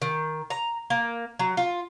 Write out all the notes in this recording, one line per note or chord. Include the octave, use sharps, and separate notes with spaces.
D#3
A#5
A#3
F#3
F4